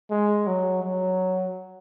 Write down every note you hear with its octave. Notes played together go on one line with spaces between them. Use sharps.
G#3
F#3
F#3